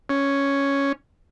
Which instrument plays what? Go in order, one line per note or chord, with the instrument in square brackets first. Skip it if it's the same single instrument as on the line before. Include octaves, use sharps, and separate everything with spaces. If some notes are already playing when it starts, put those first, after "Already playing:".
[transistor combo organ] C#4